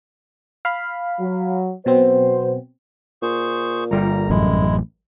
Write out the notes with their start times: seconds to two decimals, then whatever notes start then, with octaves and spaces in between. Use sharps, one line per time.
0.65 F5 B5
1.19 F#3
1.86 B2 F#3 C4 F#4 B4 C5
3.22 A#2 G#4 C5 C#6
3.91 G1 G3 A#4 A#5
4.30 A1 F#2 G#3 E4